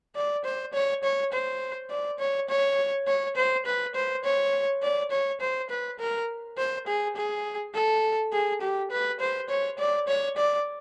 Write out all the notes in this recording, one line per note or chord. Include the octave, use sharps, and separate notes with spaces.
D5
C5
C#5
C#5
C5
D5
C#5
C#5
C#5
C5
B4
C5
C#5
D5
C#5
C5
B4
A#4
C5
G#4
G#4
A4
G#4
G4
B4
C5
C#5
D5
C#5
D5